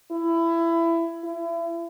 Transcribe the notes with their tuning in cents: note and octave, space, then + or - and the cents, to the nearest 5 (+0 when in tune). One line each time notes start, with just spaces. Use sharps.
E4 +20
E4 +35